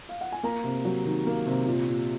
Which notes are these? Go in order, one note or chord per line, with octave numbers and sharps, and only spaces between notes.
F5
F#5
G#5
A#3 A#5
C3
F#3
D#3
A#3
C3
A#2
A#2